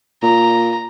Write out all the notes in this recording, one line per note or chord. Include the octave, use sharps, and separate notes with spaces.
A#2 A#5